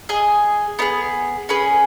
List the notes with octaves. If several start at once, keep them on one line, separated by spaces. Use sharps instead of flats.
G#4 D#5 G#5
B3 D#4 G#4
C#4 G#4 B4